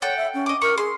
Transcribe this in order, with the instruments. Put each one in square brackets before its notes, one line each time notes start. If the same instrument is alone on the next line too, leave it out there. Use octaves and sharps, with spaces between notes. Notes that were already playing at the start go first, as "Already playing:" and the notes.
[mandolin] A4 F#5 G5 [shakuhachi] C#5
[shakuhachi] E5
C#4
[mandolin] D#5 D6
[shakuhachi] A#4 [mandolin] C#6
[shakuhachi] G#4 [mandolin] C6